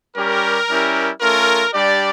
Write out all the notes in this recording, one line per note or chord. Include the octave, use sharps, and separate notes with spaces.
G3 C#4 G4 A#4
G3 C#4 E4 G4
A3 C#4 F4 A#4
G3 D4 G4 D5